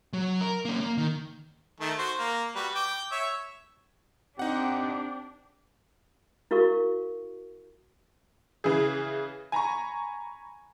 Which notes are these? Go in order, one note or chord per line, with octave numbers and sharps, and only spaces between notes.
F#3
A#4
A#3 C#4
A#3
D#3
D#3 A3
F#4 C5
A#3
G3 F#4 B4
G5 D6
C#5 E5
C4 D4 D#4 G4 F#5
E4 F#4 A#4 F5 C#6
C#3 E3 G#4
G#5 A#5 B5 C#6